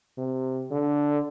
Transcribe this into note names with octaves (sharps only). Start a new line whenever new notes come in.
C3
D3